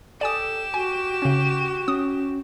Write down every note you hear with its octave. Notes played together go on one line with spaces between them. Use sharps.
G4 A4 D5 G#5 D#6 E7
F#4 G#5
C#3 C#4
C#4 D#6